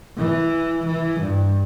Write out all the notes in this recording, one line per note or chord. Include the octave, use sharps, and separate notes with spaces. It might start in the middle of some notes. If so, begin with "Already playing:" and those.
E3
E3
G2